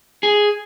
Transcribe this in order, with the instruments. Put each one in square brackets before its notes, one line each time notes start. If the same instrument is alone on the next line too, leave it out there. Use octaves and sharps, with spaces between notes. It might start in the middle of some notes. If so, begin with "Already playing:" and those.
[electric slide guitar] G#4